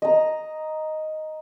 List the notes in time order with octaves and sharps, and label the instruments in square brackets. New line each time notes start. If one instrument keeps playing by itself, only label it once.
[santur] D#5 A#5